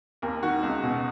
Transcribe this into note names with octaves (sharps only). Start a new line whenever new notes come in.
D#2 A#4
D#3 F#4
C#2
B2